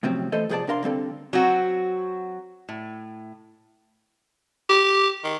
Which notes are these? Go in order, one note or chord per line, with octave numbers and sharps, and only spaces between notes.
A2 C3 F3 F#3 C4 C#4
E3 A3 A4 C5 D#5
C2 F3 G#4 B4 D5 A5
C3 D4 A#4 F5 C6
D3 G3 C4 A4
F#3 C4 F#4
A2
G4
D#3